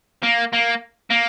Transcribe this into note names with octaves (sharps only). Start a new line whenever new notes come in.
A#3
A#3
A#3